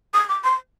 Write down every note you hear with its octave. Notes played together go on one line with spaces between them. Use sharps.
D#6
D6
C6